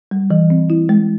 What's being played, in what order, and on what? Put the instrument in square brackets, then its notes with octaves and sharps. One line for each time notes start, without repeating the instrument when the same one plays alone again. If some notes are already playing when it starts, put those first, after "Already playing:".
[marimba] G3
E3
C4
E4
G#3